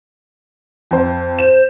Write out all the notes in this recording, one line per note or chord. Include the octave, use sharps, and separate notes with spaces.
F2 C5
C5 E7